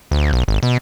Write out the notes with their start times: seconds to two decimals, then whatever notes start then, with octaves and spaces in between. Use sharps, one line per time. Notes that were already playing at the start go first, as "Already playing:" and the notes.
0.11 D2
0.33 B1
0.48 G#1
0.63 B2